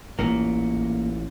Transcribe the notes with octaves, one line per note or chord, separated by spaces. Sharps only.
A1 A#2 A#3